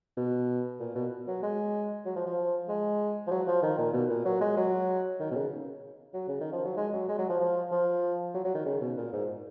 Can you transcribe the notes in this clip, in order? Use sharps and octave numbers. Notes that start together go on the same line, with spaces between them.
B2
A#2
B2
F#3
G#3
F#3
F3
F3
G#3
F3
F#3
F3
D#3
A#2
B2
A#2
F#3
G#3
F#3
D#3
B2
C#3
F#3
C#3
D#3
F3
F#3
G#3
F#3
G#3
F#3
F3
F3
F3
F#3
F#3
D#3
C#3
B2
A#2
G#2